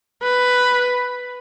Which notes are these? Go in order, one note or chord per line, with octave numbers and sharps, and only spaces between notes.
B4